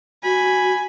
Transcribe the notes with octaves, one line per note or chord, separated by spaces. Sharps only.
F#4 G#5 B5